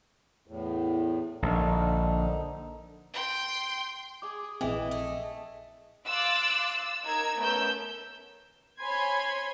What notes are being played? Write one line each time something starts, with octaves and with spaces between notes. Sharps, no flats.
E2 A2
A#1 D3 D#4
G5 C6
G#4 D6
A#1 E3 C4 G#4 D#5 E5 G5
A3
F5 C6 D6 E6 F#6 A6
E6
D#4 A#4 A#5 E6 G#6
A3 B3 C#4 A#4 E6 G6
C5 C#5 G#5 B5 C6 G#6